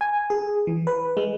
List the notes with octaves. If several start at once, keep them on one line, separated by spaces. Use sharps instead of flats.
G#5
G#4
E3
B4
G#3